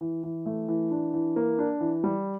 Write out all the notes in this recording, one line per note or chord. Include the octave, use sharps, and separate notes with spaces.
E3
E3
A3
E3
D4
E3
A#3
D4
E3
G3